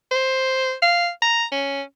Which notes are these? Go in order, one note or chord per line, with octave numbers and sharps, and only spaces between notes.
C5
F5
A#5
C#4